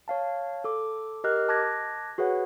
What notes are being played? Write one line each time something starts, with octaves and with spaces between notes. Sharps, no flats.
C#5 F5 A5
A4 D6
G4 A#4 D#5 F6 F#6
A5 D6 F#6 G#6 A#6
F#4 G#4 B4 C#5 F#5